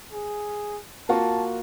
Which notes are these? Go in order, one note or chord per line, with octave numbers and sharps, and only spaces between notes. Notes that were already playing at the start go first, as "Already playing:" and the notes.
G#4
A#3 F4 F#4 A5